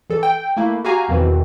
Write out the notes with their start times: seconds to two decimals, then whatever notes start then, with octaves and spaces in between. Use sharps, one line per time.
0.10 E3 A4
0.23 G5
0.57 A3 A#3 E4
0.85 F#4 G4 F5 G#5 A#5
1.08 E2 B2 D#3 E3 C4